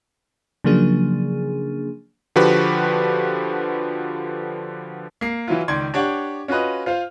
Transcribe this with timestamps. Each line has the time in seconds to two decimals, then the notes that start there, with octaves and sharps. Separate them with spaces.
0.64 C#3 F3 F#3 A#3 D4 G#4
2.36 D3 F3 F#4 G4 B4
5.21 A#3 C7
5.48 E3 F#3 E4 F4
5.68 C#2 D#3 D5 C6 G#6
5.94 D4 G4 C#5 D5 F#5
6.48 C#4 F4 F#4 B4 D#5
6.86 F4 C5 F5